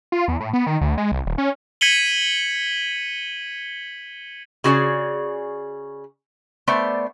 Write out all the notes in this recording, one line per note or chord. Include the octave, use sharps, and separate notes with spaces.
F4
E2
A2
B3
D#3
D2
G#3
C2
D#1
C#4
G#6 B6 C#7 D#7 F#7 G7
C#3 F#4 G#4 D5
A3 B3 C5 D5